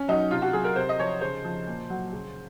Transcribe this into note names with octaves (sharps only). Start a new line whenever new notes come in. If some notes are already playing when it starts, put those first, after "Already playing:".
Already playing: C#4
F#3 D#4
C3 F4
F#4
F#3 G#4
A#4
C3 C5
D#5
F3 C#5
C#3 C5
F3
A#2
F#3
C#3